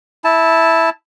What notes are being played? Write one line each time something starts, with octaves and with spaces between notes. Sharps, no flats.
E4 A5